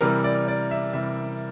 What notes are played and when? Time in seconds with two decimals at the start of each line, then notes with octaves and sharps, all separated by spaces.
0.01 C3 E3 G3 A#4
0.24 D5
0.48 D5
0.71 E5
0.93 C3 E3 G3 E5